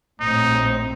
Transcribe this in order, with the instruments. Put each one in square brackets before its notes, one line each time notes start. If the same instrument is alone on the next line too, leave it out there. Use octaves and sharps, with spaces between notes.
[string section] A#1 A2 C4 [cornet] D#4